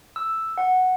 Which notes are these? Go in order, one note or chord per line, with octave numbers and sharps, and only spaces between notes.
E6
F#5